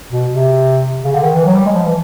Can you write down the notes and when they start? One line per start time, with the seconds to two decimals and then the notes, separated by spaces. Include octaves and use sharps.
0.11 B2
0.31 C3
1.04 C#3
1.14 D3
1.24 D#3
1.34 E3
1.45 F#3
1.55 G3
1.66 G#3
1.75 F3
1.85 E3